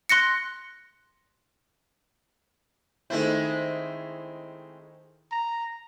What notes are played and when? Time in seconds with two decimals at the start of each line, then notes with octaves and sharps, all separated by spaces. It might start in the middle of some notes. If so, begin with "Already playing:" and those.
0.09 C6 F#6 A#6 C#7
3.10 D#3 G#3 A3 C4 E4 C5
5.32 A#5